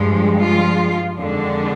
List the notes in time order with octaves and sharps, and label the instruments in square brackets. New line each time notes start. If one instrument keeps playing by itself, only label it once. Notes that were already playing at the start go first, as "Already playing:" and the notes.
Already playing: [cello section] G2 F3 G#3
F3 F4
F2 D3 D#3 G#3 D4